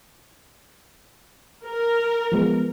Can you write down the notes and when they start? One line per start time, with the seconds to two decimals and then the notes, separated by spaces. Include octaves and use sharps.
1.63 A#4
2.32 F3 G#3 B3